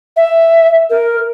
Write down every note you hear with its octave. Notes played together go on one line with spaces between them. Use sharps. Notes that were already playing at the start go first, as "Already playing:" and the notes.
E5
A#4